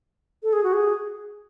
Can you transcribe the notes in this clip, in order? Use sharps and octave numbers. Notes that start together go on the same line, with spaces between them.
A4
G#4
F#4
G#4